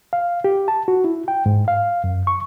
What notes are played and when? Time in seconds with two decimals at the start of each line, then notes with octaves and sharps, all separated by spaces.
0.13 F5
0.44 G4
0.68 A5
0.88 F#4
1.04 E4
1.28 G5
1.46 G#2
1.68 F5
2.04 F#2
2.27 C#6